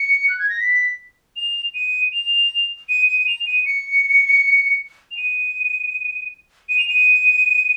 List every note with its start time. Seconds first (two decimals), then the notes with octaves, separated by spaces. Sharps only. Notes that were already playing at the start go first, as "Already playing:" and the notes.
Already playing: C#7
0.29 F#6
0.39 G#6
0.50 A#6
0.60 B6
1.36 F7
1.75 D#7
2.13 F7
2.89 D#7
3.07 D#7
3.19 D#7
3.27 F7
3.46 D#7
3.66 C#7
5.11 F7
5.17 D#7
6.69 D#7
6.78 F7
6.88 D#7